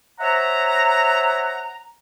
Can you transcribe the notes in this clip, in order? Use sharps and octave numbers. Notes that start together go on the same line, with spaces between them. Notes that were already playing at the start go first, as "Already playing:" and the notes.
C5 C#5 E5 F#5 A#5